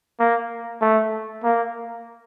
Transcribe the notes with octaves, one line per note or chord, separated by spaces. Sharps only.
A#3
A3
A#3